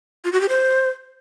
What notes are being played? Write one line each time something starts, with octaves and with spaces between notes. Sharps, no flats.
F4
F#4
G4
C5